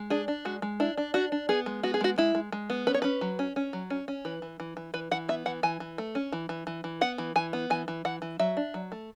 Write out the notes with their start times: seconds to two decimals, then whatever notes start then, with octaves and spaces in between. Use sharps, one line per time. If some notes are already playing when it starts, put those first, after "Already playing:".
Already playing: G#3
0.10 D4 G#4
0.28 D4
0.45 G#3 F#4
0.62 G#3
0.80 D4 E4
0.97 D4
1.14 D4 F#4
1.32 D4
1.49 B3 G#4
1.66 G#3
1.83 B3 F#4
1.94 G#4
2.01 G#3 F#4
2.18 G#3 E4
2.35 G#3
2.52 G#3
2.70 B3
2.87 C#4 B4
2.94 C#5
3.02 C#4 B4
3.21 F#3
3.39 C#4
3.56 C#4
3.73 F#3
3.90 C#4
4.08 C#4
4.25 E3 B4
4.42 E3
4.60 E3
4.77 E3
4.94 E3 B4
5.11 E3 F#5
5.29 B3 E5
5.46 E3 F#5
5.63 E3 G#5
5.80 E3
5.98 A3
6.15 C#4
6.32 E3
6.49 E3
6.67 E3
6.84 E3
7.01 B3 F#5
7.18 E3
7.36 E3 G#5
7.53 B3
7.70 E3 G#5
7.88 E3
8.05 E3 F#5
8.22 E3
8.39 F#3 E5
8.57 D4
8.74 F#3
8.92 A3